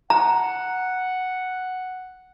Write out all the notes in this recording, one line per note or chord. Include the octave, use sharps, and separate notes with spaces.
F#5 A#5